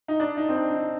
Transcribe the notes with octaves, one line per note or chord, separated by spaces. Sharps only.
D#4
D4
D#4
C4
D4
D#4